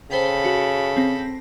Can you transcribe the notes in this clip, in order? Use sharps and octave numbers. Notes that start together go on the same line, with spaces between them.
C#3 A4 C5 G5 B5
F#4
C4 A#6